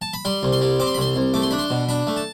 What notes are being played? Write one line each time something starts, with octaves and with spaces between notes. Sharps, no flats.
A5
B5
G3 C6
C2
C6
G3
C4 D6
C6
B5
C2 C6
C2
A3 D6
C6
D4 B5
C6
B2
D4 B5
A3
A5